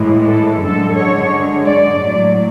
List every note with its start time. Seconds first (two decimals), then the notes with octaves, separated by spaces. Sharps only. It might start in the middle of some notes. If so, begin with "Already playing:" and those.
Already playing: A2 E3 G#3
0.27 A4
0.62 F#2 D3 G#3 A4
0.96 C#5
1.66 D5
2.00 A2 F#3